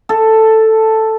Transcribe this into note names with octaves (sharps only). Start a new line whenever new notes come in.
A4